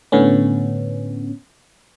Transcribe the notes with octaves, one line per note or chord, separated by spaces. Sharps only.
A2 D3 B3 C#4